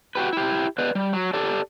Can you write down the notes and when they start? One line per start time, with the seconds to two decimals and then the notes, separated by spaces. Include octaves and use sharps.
0.15 F#4 G4 B4
0.33 E4 G4
0.78 B3 B4 D5 D#5
0.95 G3
1.13 F#3
1.33 G4 A4 D5